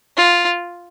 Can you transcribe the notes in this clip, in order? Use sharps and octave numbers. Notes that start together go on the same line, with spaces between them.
F4